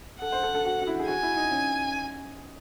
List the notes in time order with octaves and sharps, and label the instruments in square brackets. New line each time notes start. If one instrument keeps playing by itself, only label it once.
[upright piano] A4 [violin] F#5
[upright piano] C5
A4
A4
F#4
F#4
E4
G#4
[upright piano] F#4 [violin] G#5
[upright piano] E4
D#4
C#4